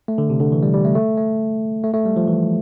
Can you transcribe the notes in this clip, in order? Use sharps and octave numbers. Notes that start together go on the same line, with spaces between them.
A3
D3
C3
D3
E3
G3
G3
A3
A3
A3
A3
A3
G3
F3
E3